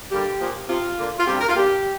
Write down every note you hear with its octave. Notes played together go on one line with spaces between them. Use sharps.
D3 G3 A#3 G4
A#2 F3 A#3
C3 F3 C4 F4
D3 A#3 D4
F4
C3 G3 D4 G4
A#4
F4
A#2 A#3 D4 G4